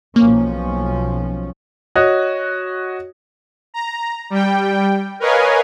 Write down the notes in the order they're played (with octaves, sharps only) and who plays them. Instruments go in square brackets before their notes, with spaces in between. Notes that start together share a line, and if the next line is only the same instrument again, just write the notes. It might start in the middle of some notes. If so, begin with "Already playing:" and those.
[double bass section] B1 F3 C#4 [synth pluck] A#3
[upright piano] F#4 C#5 D#5
[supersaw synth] A#5
G3 G5
A#4 B4 C#5 D#5 F5 G#5